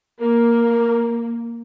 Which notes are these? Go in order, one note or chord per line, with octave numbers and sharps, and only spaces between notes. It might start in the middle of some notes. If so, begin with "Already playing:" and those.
A#3 A#4